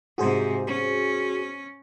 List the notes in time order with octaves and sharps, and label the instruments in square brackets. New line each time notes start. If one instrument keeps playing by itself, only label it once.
[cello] G#2 C3 [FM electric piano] F#4 G#4 C5
[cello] C#4